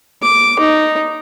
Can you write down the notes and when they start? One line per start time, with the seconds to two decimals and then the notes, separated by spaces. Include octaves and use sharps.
0.22 D6
0.59 D#4